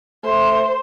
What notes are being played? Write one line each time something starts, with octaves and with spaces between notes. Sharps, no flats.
A3 C5